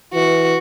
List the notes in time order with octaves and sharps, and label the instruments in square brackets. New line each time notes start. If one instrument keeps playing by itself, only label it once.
[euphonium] E3 [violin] F#4